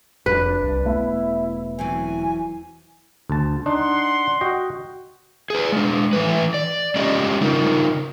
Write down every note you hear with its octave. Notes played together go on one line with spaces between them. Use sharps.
F1 D4 B4
C2
E1 A3 B3 E4
E3 F#3 C4 G#5
D2 A5
D4 D#4 F#5 C6
F#4 D#5 G5
G#4 B4
G#3 D4
E3 A3 B4
D5
G#3 C#4 G4 D5 D#5
C#3 D#4 F4 A#4